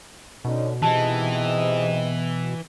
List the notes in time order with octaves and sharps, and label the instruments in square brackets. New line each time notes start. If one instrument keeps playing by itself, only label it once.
[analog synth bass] B2 [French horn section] D3 C#4 D#4
[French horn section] G#2 C3 D#5 [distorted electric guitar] E3 [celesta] A5